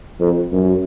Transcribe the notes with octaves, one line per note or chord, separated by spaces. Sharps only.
F2
F#2